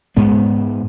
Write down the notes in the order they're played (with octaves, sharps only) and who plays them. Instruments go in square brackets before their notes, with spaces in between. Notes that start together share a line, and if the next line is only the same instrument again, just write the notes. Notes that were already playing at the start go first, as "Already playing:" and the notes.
[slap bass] G#2 G#3 B3